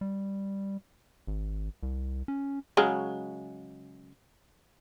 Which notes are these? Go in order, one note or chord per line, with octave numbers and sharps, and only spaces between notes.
G3
G#1
C2
C#4
C#3 F#3 G#3